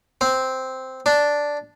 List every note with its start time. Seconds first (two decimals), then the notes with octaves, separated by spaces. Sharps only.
0.21 C4
1.06 D4